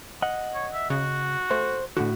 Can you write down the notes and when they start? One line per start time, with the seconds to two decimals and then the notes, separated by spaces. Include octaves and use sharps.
0.22 D#5 F#5
0.54 C#5
0.73 E5
0.90 C#3 F#4
1.51 A3 C5
1.97 A2 D3 F#4